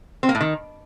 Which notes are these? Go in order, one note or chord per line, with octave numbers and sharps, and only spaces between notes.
C4
A#3
A2
D#3